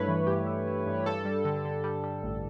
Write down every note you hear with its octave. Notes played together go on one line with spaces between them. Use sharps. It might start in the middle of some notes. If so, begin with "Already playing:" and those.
Already playing: G2 A3 E4 B4 C#5
E3
G2 G4
E4
E4
G2
G2 A4
G3
D3
D3
G3
G3
A1